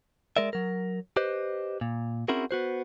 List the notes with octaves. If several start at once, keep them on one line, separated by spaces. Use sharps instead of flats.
G#3 A#4 D5 E5
F#3 A#4
G4 B4 C5 D#5
A#2
C4 C#4 E4 F#4 G#4 A#4
B3 F#4 C5